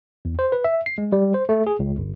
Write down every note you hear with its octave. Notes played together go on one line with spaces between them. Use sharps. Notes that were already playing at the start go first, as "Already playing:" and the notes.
E2
C5
B4
E5
C7
G#3
G3
C5
A3
G#4
C#2
G1